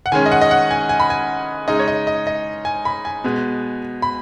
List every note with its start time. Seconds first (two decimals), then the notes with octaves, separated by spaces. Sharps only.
0.06 F#5
0.12 D#3 G#3 C#4 G#5
0.26 D#5
0.32 F#5
0.41 D#5
0.51 F#5
0.71 G#5
0.89 G#5
1.00 B5
1.10 G#5
1.68 C#3 G#3 D#4 D#5
1.79 C#5
1.88 D#5
2.07 D#5
2.27 D#5
2.65 G#5
2.85 B5
3.05 G#5
3.24 B2 G#3 B3
4.02 B5